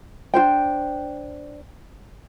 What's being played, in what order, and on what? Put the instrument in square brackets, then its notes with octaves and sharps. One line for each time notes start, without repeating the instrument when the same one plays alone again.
[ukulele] D4 F#4 C5 G5